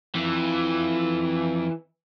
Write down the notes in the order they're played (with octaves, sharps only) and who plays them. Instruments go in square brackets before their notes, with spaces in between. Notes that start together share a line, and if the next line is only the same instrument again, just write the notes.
[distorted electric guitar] F2 [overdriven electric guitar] E3